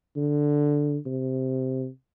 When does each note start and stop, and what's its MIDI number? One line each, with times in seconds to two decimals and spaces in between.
0.16 0.97 50
1.06 1.87 48